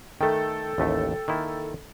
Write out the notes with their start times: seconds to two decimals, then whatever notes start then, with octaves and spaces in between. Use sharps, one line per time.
0.21 D#3 A3 A4 G5
0.78 A1 D#2 A3
1.28 D#3 A#3 E4